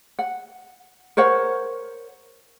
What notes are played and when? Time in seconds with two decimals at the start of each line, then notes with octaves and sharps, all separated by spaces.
0.19 F#5
1.17 A#4 C5 C#5 F#5